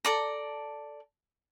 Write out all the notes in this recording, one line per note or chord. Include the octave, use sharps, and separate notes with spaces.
A4 D5 A#5